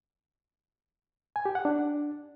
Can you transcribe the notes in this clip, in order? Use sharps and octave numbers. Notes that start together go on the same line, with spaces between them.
G#5
G4
F#5
D4